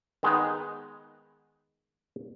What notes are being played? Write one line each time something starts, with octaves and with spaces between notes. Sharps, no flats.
D#3 G#3 B3 D#4